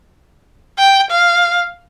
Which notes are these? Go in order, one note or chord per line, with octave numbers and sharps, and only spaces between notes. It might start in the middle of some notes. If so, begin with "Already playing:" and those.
G5
F5